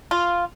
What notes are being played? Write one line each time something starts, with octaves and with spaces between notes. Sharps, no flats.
F4